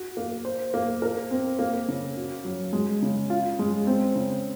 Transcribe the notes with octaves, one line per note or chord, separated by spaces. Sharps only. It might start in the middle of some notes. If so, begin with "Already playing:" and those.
Already playing: F#4
A#3
C5
A#3
A#4
C4
A#3
C#3
F#4
F#3
G#3
C#3
F4
G#3
C4
C#3